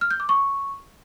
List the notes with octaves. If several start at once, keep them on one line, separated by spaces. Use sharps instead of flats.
F6
G6
D6
C#6